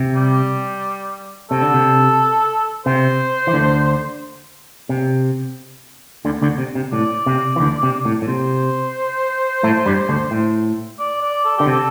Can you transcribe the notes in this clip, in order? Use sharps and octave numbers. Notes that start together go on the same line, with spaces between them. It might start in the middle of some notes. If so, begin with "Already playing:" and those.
Already playing: C3
G3
C3 A4
D3
C3
C3 C5
E3
D2 D3
C3
D2 D3
D2 D3
C3
C3
A2 D5
C3
E3
D2 D3
C3
A2
A2
C3 C5
A2 A3
G2 G3
D2 D3
A2
D5
D5
A4
D3 G4
C3 A4